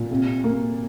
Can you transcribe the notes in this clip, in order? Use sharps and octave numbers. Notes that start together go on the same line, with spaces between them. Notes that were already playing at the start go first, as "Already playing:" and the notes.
Already playing: A#2
C3
A#3